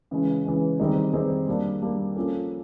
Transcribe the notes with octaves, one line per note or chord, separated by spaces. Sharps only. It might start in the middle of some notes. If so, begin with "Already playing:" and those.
C#3 E3 G#3 C#4
C#3 E3 G#3 C#4
D#3 G3 C4 D#4 G#4
D#3 G3 C4 D#4 G#4
G3 A#3 D4
G3 A#3 D4
F3 A#3 C#4 F4 A4